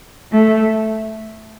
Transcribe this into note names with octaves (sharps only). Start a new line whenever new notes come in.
A3